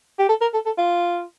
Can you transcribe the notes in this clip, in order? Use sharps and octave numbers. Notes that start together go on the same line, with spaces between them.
G4
A4
A#4
A4
A4
F4